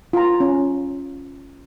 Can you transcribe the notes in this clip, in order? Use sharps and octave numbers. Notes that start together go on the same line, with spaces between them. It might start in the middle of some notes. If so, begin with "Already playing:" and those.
F4 A#5
C#4